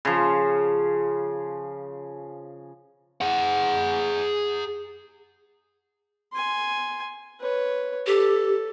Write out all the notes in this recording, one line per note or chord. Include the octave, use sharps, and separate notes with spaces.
C#3 F3
G#4 F#5
G#5 C6
B4 C#5
G4 A4